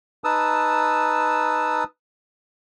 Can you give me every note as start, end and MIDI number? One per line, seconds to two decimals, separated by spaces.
0.24 1.84 63
0.24 1.84 71
0.24 1.84 81
0.24 1.84 87
0.24 1.84 88